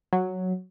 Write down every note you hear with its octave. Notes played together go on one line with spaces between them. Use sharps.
F#3